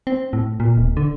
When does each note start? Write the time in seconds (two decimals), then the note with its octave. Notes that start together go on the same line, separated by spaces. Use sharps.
0.07 C4
0.33 A2
0.60 A#2
0.77 D1
0.97 D3